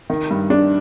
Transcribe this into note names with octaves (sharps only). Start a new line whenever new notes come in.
D#3
G2
D4